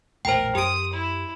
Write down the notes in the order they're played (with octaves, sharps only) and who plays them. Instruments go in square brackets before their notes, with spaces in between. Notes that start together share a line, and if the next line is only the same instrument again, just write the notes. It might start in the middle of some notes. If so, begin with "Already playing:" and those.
[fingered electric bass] E1 A#1 A2 [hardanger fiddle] A#4 [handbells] C5 G5
[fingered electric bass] F#2 [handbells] G4 D7 [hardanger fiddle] D#6
[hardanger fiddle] E4